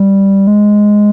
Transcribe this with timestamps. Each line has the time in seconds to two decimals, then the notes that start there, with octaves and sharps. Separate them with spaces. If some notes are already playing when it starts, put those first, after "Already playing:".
Already playing: G3
0.47 G#3